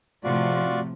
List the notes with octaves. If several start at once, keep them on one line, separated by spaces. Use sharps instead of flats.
A2 C3 F3 F4 F#4 D5